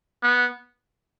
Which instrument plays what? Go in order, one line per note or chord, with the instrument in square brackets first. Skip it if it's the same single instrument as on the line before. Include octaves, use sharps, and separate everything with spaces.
[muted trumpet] B3